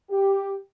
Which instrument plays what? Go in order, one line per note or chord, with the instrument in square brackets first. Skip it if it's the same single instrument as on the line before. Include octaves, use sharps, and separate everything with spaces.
[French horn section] G4